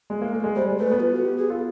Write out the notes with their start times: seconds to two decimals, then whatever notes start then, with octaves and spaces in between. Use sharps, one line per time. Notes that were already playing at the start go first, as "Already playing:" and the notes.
0.10 G#3
0.22 A#3
0.32 A3
0.44 G#3
0.56 G3 C5
0.67 G#3
0.79 A3 B4
0.91 B3
1.00 F4
1.12 F#4
1.25 G4
1.37 G#4
1.49 F4 A4